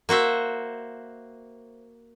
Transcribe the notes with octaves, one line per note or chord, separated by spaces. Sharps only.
A#3 F#4 C5 E5